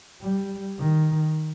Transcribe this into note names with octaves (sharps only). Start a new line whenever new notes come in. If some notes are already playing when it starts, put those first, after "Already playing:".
G3
D#3